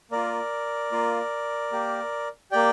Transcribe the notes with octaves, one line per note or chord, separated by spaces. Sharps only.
A#3 F4 A#4 D5
A#3 F4
A#3 G4
A#3 G4 D5 G5